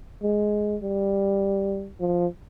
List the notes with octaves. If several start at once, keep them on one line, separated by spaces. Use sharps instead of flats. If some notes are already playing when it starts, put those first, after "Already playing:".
G#3
G3
F3